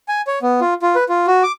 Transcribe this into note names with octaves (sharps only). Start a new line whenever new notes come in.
G#5
C#5
B3
F4
F4
B4
F4
F#4
D6